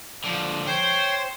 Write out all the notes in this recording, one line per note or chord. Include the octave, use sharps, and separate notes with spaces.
D3 F3
C5 C#5 G5 C6